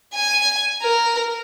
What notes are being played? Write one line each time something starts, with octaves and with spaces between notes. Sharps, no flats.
G#5
A#4